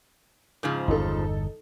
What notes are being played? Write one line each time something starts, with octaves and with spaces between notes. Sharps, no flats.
G#2 C#3 F3
G1 E2 D#4 A4